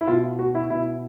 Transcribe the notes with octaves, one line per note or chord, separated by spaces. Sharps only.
E4
B2 F4
F#4
E4
B2 E4